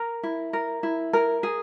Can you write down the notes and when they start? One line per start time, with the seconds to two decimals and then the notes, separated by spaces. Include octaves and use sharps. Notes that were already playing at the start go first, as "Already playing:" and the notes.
Already playing: A#4 A#5
0.23 E4
0.53 A#4
0.83 E4
1.13 A#4
1.43 G#4